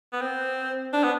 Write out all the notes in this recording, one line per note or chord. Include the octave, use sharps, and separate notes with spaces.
B3
C4
D4
B3